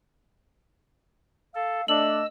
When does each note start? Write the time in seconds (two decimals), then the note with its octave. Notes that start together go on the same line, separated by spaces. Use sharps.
1.55 A4 F5
1.88 A3 D4 D#5 E6 F#7